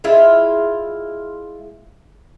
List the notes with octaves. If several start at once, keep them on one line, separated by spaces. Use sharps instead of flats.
G#3 E4 F4 E5